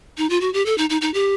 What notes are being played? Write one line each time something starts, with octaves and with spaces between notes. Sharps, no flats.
D#4
F4
F#4
G4
A4
D#4
D#4
D#4
G4